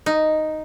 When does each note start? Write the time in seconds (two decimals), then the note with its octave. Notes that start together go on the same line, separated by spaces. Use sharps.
0.06 D#4